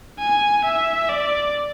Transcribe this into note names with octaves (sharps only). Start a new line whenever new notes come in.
G#5
E5
D5